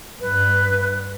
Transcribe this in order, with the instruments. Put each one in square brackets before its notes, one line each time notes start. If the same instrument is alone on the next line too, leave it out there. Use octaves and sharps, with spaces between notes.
[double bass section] G2 [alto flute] B4